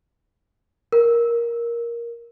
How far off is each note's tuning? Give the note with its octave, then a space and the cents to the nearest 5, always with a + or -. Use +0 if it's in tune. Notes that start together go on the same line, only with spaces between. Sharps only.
A#4 +10